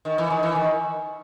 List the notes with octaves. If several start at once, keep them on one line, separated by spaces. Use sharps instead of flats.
D#3
E3
D#3
E3
D#3